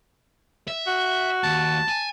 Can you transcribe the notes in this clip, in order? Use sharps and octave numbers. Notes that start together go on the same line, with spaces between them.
E5
F#4
D#2 A5
G#5